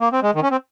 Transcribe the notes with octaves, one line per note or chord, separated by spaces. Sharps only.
A#3
C4
G#3
D#3
C#4
C4